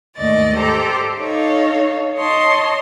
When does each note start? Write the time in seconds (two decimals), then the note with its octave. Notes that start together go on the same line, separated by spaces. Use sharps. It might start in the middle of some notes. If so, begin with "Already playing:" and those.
0.16 D#2 G#2 A3 D5 D#5 A6
0.55 G4 A4 C5 A#5 C6 D6
1.18 D#4 A4 C#5 F5
2.15 C#5 D#5 A5 C6